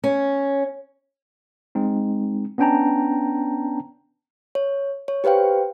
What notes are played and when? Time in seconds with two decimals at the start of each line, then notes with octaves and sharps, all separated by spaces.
0.04 C#4
1.75 G#3 C4 D#4
2.58 B3 C#4 D4 G5 A5 A#5
4.55 C#5
5.08 C#5
5.24 G4 B4 C5 F5 G5